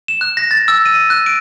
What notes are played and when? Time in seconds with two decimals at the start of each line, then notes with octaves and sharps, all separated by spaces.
0.08 E7
0.21 F#6
0.37 A#6
0.51 A6
0.68 E6
0.85 D#7
1.10 F#6
1.26 D7